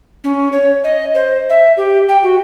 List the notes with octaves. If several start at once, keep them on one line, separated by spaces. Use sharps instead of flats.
C#4
C#5
D#5
C5
E5
G4
G5
F#4